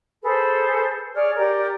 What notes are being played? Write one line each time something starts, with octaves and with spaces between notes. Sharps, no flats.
G#4 A4 B4 C5
G#4 C#5 D5 F6
G4 A#4 D5